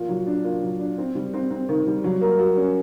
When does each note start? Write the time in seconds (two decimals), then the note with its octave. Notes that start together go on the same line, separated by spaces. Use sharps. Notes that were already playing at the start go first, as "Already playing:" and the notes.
Already playing: A#2 F3
0.09 F#3
0.26 D4
0.44 A#2
0.62 F#3
0.79 D4
0.98 C4
1.15 G3
1.34 C4
1.51 C4
1.69 D#3
1.87 G3
2.04 F#3
2.21 A#3
2.39 F#4
2.57 C#4